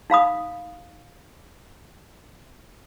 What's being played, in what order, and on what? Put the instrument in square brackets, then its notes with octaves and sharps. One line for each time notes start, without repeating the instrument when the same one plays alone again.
[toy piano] D#4 F5 B5 D#6